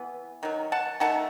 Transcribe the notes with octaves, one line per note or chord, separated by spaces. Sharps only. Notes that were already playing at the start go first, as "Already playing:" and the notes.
Already playing: E3 B3
D#3 F#3
F#5 A5
D#3 A3 F#5 A5